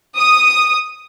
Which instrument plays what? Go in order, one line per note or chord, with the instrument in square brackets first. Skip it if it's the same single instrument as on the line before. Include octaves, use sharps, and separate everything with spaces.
[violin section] D#6